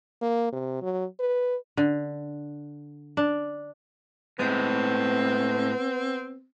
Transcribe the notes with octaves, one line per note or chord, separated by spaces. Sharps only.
A#3
C3
F#3
B4
D3
D4
A2 G#3 B3 C4